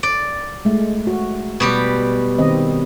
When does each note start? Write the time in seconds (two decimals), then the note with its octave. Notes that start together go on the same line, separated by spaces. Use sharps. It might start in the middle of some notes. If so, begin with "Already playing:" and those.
0.03 D5
0.65 G#3 A3
1.07 F#4
1.60 B2 G3 G4
2.38 D#3 C4 D#5